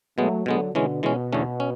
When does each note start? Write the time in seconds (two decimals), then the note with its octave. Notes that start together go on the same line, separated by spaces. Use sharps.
0.18 B2 F#3 G#3 A3 B3
0.46 B2 D3 F#3 G#3 B3
0.74 B2 D3 E3 G#3 C#4
1.03 B2 E3 G#3 C#4
1.32 E2 D3 A3 C#4
1.60 C#4